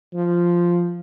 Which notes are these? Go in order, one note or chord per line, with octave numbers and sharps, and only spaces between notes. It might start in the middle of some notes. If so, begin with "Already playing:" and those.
F3